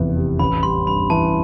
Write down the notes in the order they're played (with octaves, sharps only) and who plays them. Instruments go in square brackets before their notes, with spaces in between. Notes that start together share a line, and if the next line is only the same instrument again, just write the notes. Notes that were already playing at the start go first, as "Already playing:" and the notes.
Already playing: [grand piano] F1 E2 E3
C3
[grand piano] A1 [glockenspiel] B5
[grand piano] G3 [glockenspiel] C6
[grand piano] G2 [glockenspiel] B5
[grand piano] E3 [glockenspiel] A5